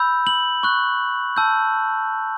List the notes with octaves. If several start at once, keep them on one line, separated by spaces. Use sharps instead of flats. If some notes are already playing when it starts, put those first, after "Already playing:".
Already playing: B5 E6 G6
F#7
C#6 F#6
A5 E6 G6